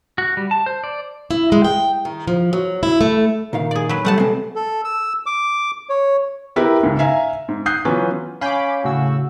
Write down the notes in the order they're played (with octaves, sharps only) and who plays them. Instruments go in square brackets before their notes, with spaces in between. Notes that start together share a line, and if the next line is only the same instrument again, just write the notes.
[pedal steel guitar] F#4
G3
A5
C5
D5
[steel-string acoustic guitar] E4
G#3
G5
D#3
F3
F#3
E4
A3
[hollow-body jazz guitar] A#2 D#3 F5
[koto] G#4 D5
F#3 B4
[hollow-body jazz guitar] B1 G3 [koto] A3 F#5 A5
[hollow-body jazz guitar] B2 G#3 C4
[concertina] A4
E6
D6
C#5
[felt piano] B3 E4 G4 A#4 B4
C#2 G#2
E5 F5 G#5 A#5
G#2
D#6 F#6 G6 C7
E3 F#3 B3 C#4 F4
[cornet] C#4 [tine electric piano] F5 G#5 G6 [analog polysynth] B5 D6
[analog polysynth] A2 C#3 E6 [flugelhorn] F#4